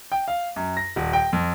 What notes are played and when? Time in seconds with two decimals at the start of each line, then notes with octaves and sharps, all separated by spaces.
0.12 G5
0.28 F5
0.56 F#2
0.77 A#6
0.96 D#1
1.13 G5
1.33 F2